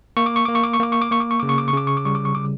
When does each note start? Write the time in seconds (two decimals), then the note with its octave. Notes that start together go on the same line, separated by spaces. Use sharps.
0.17 A#3 C#6
0.26 D6
0.36 C#6
0.45 A#3 D6
0.55 C#6
0.63 D6
0.73 C#6
0.80 A#3 D6
0.92 C#6
1.02 D6
1.11 A#3 C#6
1.20 D6
1.31 C#6
1.40 C#3 D6
1.49 C#6
1.58 D6
1.68 C#6
1.73 C#3 D6
1.87 C#6
1.97 D6
2.05 G3 C#6
2.15 D6
2.25 C#6
2.35 C#3 D6